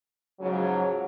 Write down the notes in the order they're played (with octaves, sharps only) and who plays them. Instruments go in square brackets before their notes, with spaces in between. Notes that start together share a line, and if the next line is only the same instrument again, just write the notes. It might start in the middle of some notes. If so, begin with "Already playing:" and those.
[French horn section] G#2 C#3 F3 F#3